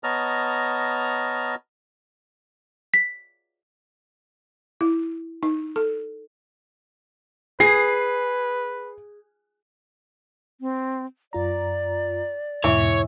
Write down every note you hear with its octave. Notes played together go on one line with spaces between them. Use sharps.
B3 C#5 D#5 A5 A#5 F6
B6
E4
D#4
A4
G#4 B4 C7
C4
F#2 F4 D5 A#5
E2 G#2 B2 E3 C#5